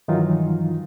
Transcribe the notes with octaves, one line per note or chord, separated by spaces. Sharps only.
G2 D#3 E3 F#3 D#4 F4